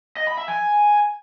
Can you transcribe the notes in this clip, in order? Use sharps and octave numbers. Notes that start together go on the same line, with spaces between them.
D#5
B5
E5
G#5